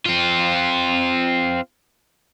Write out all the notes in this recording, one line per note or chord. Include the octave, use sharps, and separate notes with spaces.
C4 F4